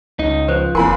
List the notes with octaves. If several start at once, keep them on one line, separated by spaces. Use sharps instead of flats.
C#2 D#4
F3 B4 C5
F1 D#2 E4 A#4 G#5 B5 C6